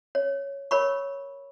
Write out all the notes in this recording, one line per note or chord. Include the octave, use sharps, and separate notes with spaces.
C#5
A#4 C#5 B5 C#6